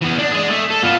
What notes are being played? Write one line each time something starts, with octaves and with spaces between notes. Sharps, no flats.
E3 B3
D4
G#4 D#5
A3
A4
B3 F4